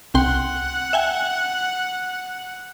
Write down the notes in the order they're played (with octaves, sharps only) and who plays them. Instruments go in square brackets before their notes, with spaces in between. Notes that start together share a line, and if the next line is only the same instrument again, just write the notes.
[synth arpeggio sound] C2 G5 C6 [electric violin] F#5
[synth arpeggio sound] E5 G5 G#5